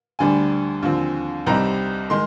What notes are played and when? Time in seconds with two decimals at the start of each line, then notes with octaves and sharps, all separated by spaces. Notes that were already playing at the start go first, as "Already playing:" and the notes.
0.19 D2 D3 G3 D4 G#5
0.82 D#2 D3 F3 C4
1.46 C2 C3 G3 C4 D#4 A#5
2.10 D#3 G#3 C6